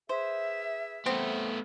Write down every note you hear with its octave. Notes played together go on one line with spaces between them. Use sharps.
G#4 B4 C5 E5
A3 B3 C4